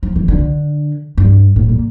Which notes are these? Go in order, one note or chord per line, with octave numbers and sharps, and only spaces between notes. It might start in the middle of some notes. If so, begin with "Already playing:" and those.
F3
E3
D3
G2
A2
A#2